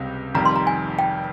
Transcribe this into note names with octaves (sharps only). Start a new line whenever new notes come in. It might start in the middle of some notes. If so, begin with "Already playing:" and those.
Already playing: C#2 C3 G3
F1 F2 D#3 G3 A#5
C6
A#5
G#5
G5